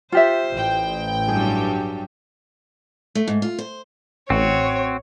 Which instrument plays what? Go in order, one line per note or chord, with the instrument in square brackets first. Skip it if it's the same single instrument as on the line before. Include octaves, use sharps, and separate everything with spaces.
[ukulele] F4 G4 E5 [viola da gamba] C5
[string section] A1 G5
[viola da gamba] G2 F#3 G3 [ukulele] G#4
[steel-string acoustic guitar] A3
G#2
F4
C5
[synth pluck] A1 [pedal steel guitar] C4 F#4 [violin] C#5